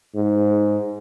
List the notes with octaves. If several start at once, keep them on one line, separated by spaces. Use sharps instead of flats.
G#2